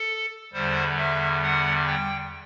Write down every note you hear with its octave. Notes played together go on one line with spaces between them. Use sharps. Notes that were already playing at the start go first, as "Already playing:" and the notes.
Already playing: A4
E2 D3 G3 C5
E5
F#5
G5